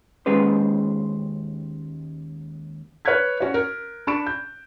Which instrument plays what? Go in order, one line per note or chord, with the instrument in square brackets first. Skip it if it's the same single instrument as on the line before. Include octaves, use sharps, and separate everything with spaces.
[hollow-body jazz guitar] D#2 G#3 C#4 G#4 B4 C5
[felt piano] B4 C#5 F6 F#6 G#6 B6
C#4 F#4 C#5
A#4
D4 B5 C#6 D7 E7
G6